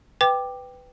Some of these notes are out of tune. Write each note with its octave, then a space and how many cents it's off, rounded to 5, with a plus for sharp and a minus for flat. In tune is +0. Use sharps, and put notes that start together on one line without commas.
B4 +15 G5 +0 D6 +10